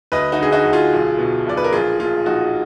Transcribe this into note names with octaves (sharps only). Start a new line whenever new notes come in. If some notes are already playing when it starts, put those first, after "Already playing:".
D2 B4 D#5
D#4 F#4
D3 G#4
D#4 F#4
D2
F4 G#4
B1
B2
B1 D5
B4
A#4
A#1 F4 G#4
A#2 F4 G#4
A#1 D#4 F#4